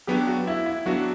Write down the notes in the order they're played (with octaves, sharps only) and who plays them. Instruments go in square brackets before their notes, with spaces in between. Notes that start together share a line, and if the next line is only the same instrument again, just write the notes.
[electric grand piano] F#3 B3 D4 [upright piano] G4
[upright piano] F#4
E4
E4
[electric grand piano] F#3 B3 D4 [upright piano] F#4